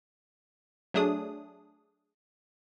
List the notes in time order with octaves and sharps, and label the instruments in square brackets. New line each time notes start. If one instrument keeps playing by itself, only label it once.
[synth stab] F#3 A3 D4 G#4 D#6